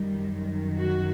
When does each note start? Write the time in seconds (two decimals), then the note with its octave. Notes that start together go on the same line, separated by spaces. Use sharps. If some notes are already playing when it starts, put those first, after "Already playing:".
Already playing: F#2 D#3 G3
0.78 F#4